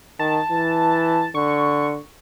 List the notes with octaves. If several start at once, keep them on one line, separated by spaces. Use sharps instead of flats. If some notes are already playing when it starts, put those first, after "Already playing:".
D#3 A5
E3
D3 C#6